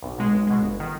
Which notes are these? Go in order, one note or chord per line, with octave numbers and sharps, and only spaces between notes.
B1
B2 G#3
B1
B2 G#3
G1
D#3